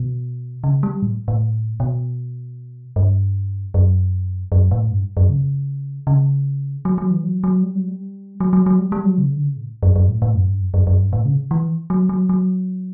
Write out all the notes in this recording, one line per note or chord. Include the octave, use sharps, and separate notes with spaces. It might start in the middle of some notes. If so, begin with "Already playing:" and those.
Already playing: B2
C#3
G3
A2
A2
B2
G2
F#2
F#2
A2
G2
F#2
C#3
C#3
F#3
F#3
E3
F#3
F#3
G3
F#3
G3
F#3
F#3
F#3
G3
G3
F#3
C#3
D3
C#3
A2
F#2
F#2
A2
A2
F#2
G2
F#2
F#2
F#2
G2
A2
C#3
E3
F#3
F#3
F#3